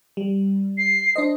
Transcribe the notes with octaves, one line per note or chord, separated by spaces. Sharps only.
G3
C7
D4 C5 D#5